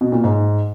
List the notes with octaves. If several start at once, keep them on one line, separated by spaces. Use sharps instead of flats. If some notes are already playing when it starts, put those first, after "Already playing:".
B2
A#2
G#2